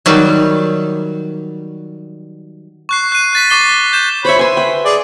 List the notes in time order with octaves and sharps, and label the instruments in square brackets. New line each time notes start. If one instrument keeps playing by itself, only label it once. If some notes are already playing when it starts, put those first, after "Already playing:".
[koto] D#3 F#3 G3
[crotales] C#6 F#6 C7
F#6 C7 D#7
F#6 A6 B6
C#6 D6 A6 C7 G7
G6 E7
[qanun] C5 E5 [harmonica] C#5 B5
[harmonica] B4 [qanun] G#5 C6
[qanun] G5
[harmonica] G#4 D5